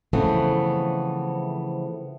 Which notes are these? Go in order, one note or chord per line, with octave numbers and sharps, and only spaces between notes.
C#3 E3 F3 A3 B3 C4